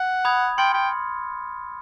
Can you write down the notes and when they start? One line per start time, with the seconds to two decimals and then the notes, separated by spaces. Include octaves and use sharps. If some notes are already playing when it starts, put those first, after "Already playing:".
Already playing: F#5
0.25 B5 D#6 G#6
0.58 G5 C6 F6 A6 C#7
0.74 G5